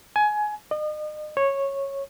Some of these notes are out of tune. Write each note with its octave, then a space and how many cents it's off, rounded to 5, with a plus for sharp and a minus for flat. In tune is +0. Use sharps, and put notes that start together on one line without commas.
G#5 +20
D#5 -40
C#5 -10